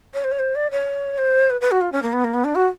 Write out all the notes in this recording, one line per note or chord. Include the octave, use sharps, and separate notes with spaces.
C#5
C5
C#5
C5
D5
C#5
C5
B4
B4
F#4
F4
C#4
A#3
B3
A#3
B3
D4
F#4